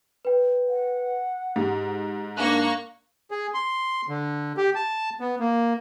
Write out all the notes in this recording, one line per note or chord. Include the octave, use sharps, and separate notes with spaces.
B4 G5
F#5
G#2 G4
A#3 D4 C#6 F#6
G#4
C6
D3
G4
A5
B3
A#3